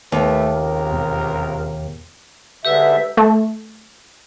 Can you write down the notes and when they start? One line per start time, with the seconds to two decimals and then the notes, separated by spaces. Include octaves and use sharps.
0.12 D#2 A3 B4
0.54 C#2 C3 A#4
0.92 E1
2.65 G#2 D3 G4 B4 E5 E6
3.17 A3